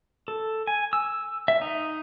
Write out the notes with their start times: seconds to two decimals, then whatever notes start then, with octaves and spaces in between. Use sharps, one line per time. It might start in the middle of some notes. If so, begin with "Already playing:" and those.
0.28 A4
0.67 G#5
0.93 E6
1.48 E5
1.61 D#4